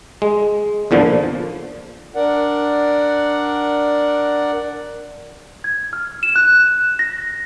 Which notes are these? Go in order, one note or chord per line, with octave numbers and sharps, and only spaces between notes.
G#3
E2 A#2 D3 F3
D4 A#4 D5 F#5
G#6
F6
E7
F#6
A#6